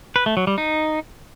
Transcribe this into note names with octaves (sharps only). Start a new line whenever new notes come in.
B4
A3
F#3
G3
D#4